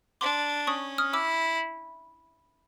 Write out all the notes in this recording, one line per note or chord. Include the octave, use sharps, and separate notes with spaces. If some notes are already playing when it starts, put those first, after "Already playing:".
D4 C6 D6
C#4 C#6 D#6
D#6 F6
E4 D6 E6